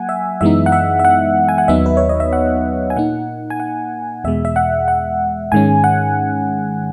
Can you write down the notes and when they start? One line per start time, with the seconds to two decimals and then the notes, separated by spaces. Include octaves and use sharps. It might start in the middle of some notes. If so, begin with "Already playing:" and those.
Already playing: F#3 A#3 F#5 G#5
0.09 E5
0.41 F#2 E3 G#3 B3 D#4 E5
0.66 F#5
0.72 E5
0.99 E5
1.05 F#5
1.49 G#5
1.58 F#5
1.68 D#2 D#3 F#3 B3 D#4 E5
1.86 B4
1.97 C#5
2.09 D#5
2.20 E5
2.33 F#5
2.90 G#5
2.96 A#2 A#3 D#4 F#5
3.50 G#5
3.60 F#5
4.24 E2 B2 G#3 E5
4.45 E5
4.56 F#5
4.88 F#5
5.52 G#2 D#3 G#3 C#4 G#5
5.84 F#5